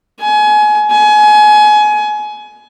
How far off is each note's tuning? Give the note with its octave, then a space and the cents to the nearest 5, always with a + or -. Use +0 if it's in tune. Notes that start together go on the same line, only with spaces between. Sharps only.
G#5 +25
G#5 +25